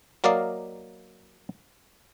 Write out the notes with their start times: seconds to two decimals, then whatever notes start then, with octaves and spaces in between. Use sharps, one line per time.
0.24 F#3 A#3 A#4 D5 D#5 F5